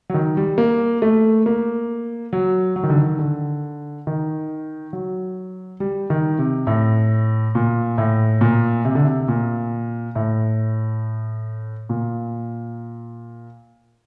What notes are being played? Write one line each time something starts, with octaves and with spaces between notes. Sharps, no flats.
F#3
D#3
G3
A#3
A3
A#3
F#3
F#3
D#3
D3
D#3
D3
D#3
F#3
G3
D#3
C3
A2
A#2
A2
A#2
C3
D3
C3
A#2
A2
A#2